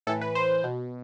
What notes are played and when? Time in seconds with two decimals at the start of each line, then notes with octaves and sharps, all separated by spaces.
0.07 A2 E3 A4
0.21 B4
0.35 C5
0.64 B2